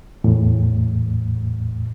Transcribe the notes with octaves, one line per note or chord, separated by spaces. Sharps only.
E2 A2